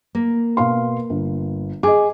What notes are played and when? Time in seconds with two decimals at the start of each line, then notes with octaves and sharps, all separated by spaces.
0.15 A#3
0.57 B2 F5 C6
1.10 G1
1.83 G#4 D#5 D6